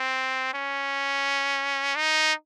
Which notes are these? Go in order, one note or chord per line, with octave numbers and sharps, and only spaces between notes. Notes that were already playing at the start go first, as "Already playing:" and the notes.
Already playing: C4
C#4
D#4